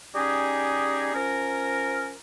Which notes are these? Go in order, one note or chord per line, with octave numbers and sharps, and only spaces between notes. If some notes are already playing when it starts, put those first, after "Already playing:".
G3 C#4 D#4 G4 G#4
F3 C#4 A#4